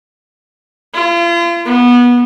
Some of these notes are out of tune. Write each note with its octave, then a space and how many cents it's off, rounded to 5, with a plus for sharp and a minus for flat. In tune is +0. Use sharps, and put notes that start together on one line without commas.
F4 -40
B3 -20